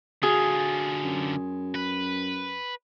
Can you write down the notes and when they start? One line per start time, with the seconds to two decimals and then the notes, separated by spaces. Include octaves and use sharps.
0.23 D3 F4 F#4 G#4
1.04 F#2
1.74 B4